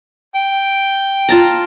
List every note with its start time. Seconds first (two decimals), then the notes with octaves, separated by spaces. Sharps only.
0.36 G5
1.29 F4 A5 A#5